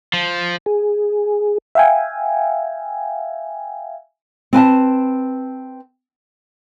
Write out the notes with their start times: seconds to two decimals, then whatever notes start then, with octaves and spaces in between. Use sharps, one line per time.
0.13 F3
0.66 G#4
1.75 E5 F5 G5 G#5
4.53 C4 B4 G#5 A5